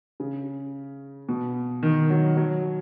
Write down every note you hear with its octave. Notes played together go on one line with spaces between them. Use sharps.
C#3
B2
D#3
F#3
F#3